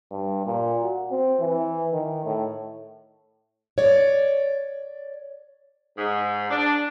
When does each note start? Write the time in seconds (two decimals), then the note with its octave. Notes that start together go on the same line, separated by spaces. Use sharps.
0.11 G2
0.46 A#2
0.83 F#4
1.12 C4
1.40 E3
1.93 D#3
2.25 A2
3.78 C#5 D5
5.97 G#2
6.51 D4